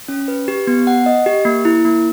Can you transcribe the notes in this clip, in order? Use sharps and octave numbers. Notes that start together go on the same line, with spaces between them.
C#4
B4
G4
B3
F#5
D#5
G4
A#3
E4
A#3